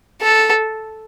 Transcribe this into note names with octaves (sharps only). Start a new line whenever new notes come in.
A4